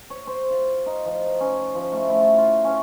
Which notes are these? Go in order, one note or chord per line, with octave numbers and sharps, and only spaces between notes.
C#5
C5
F4
D#4
F3
C#4
F3
A3
E4
F4
F4
C#4